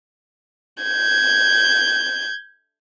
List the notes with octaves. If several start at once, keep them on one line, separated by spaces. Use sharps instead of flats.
G6 G#6